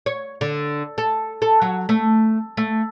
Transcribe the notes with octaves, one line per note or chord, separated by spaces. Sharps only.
C#5
D3
A4
A4
F#3
A3
A3